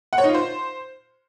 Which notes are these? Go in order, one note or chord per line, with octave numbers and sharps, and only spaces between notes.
F#5
C#5
D#4
F4
C5